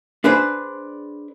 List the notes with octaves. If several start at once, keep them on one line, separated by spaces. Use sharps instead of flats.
D4 G#4 B4 C5 D5